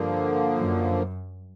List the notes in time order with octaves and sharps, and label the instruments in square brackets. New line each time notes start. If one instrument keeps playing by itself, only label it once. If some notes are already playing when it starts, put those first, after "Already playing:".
Already playing: [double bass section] G2 [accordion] D3 F3 A#3
[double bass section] F#2